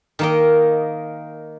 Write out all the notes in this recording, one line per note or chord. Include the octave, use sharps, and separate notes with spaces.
D#3 A#3 D#5